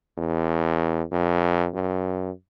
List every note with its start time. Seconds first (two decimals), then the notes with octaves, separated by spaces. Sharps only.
0.18 E2
1.12 F2
1.74 F#2